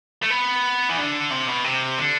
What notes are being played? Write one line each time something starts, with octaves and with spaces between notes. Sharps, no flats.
A3
B3
E3
D3
C3
B2
C3
D3